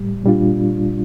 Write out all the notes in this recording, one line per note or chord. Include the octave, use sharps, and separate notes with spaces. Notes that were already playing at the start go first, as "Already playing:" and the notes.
Already playing: A2 G3
A#2 G3 D4 F4